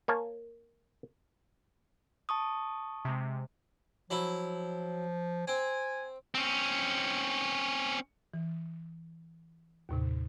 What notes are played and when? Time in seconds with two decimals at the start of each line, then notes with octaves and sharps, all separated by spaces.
0.08 A#3 C#5 G#5 A5
2.29 A5 C#6 D#6
3.05 C3 G#3
4.11 F3 F#3 E4
5.48 C4 G#5
6.35 C4 C#4
8.34 E3
9.89 D#2 A2 C3